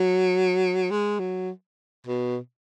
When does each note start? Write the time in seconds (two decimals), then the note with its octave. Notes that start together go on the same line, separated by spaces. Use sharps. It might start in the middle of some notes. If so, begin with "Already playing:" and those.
Already playing: F#3
0.91 G#3
1.20 F#3
2.07 B2